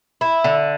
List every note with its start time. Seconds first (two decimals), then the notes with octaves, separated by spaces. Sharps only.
0.21 E4
0.44 D3